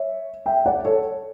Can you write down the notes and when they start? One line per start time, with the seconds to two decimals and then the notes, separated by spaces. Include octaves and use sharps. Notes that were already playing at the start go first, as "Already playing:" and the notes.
Already playing: C#5 E5
0.46 E5 G5
0.66 D5 F#5
0.85 A4 C#5